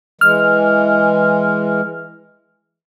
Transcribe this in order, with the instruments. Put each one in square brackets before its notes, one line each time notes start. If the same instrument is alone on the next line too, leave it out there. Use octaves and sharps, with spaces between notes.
[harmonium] E3 G#3 [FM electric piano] F6